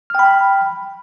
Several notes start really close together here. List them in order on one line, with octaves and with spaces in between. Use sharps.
F6 G5 B5